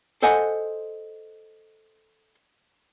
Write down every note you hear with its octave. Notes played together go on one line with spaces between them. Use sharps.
A4 C5 D#5 F#5 G#5